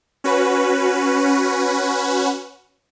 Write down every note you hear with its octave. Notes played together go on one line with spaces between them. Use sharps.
C#4 F#4 B4